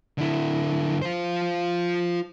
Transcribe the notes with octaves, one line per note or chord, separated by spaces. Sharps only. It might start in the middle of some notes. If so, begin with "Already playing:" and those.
D3 E4
F4 C5